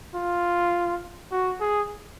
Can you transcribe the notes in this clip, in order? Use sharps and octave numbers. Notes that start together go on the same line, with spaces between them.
F4
F#4
G#4